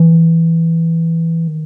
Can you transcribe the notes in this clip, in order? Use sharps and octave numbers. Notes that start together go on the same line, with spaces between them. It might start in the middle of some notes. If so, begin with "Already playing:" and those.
Already playing: E3
D#3